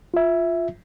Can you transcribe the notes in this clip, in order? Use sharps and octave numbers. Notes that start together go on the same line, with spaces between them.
F4 E5